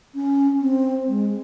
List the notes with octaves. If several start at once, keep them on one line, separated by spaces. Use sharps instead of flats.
C#4
C4
G#3